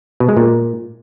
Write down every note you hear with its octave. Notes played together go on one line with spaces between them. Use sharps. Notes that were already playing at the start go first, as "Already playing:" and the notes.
B2
G#3
A#2